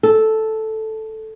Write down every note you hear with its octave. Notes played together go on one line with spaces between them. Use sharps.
A4